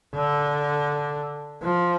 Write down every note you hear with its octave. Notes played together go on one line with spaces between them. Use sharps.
D3
F3